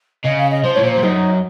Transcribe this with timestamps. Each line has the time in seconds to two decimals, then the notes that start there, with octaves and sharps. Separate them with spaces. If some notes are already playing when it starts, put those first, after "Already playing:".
0.24 C#3 D#5
0.38 F5
0.51 D#5
0.64 F3 C5
0.74 C#5
0.77 A2
0.83 A#2 C5
0.93 C5
0.97 F2
1.03 F#2 D#4